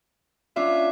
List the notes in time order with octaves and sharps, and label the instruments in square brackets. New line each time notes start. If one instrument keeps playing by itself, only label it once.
[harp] C#4 D4 F4 [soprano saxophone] E5